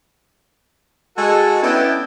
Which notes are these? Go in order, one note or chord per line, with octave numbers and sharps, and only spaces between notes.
G#3 F#4 A4
B3 C#4 D4 E4 D#5 G5